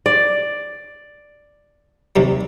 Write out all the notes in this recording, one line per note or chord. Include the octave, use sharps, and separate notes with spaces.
D5
D#2 C3 G3